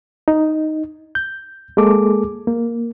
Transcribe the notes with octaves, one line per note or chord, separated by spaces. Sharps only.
D#4
G6
G#3 A#3 G#4 A4 D6
A#3